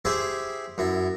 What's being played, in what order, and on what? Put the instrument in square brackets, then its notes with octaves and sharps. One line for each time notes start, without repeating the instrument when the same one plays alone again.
[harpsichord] E4 G4 G#4 C5 E5
F#2 E4